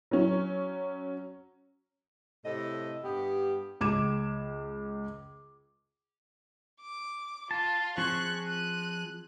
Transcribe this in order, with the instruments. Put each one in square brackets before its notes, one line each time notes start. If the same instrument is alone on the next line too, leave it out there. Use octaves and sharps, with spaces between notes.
[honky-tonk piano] F#3 C#4
[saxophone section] A2 C3 A4 D#5
G2 B3 G4
[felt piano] C#2 D6 G#6 E7
[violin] D6
[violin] F4 [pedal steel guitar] A5
[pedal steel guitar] F3 C4 G#4 [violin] C#6 F#6
[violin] F#6 D#7